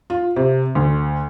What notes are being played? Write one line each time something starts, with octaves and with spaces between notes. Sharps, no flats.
F4
C3
D2